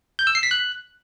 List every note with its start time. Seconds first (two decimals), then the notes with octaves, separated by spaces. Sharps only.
0.19 G6
0.27 E6
0.35 C7
0.43 B6
0.51 F#6